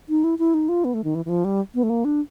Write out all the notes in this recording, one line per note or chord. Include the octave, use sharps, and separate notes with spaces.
D#4
E4
E4
D#4
F4
B3
A3
D#3
E3
E3
F3
G3
B3
A3
A#3
D4